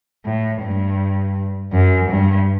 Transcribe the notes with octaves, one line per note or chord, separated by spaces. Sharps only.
A2
G2
F#2
G2